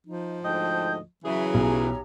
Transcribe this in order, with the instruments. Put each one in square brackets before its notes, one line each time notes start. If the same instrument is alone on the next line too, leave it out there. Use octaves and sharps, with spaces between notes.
[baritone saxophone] F3 [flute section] D#4
[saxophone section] D2 G#2 D#5 [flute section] G5 A5 G6
[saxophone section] C#3 E3 G#4 [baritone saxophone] F#3 [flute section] E5 G#5
[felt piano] B1 [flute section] G4 C#5 A#5